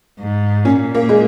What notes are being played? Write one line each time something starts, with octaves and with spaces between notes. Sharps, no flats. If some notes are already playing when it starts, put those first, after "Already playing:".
G#2
A#2 C#4
A#3
G#3